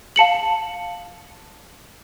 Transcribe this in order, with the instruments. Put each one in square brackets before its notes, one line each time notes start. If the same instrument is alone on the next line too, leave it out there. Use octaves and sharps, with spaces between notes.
[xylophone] F5 A5 C#7 F#7